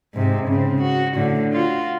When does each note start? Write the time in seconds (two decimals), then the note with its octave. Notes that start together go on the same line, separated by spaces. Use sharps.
0.14 G#2 C3
0.48 C#3 C4
0.81 F#4
1.15 A2 D3
1.53 F4 F#4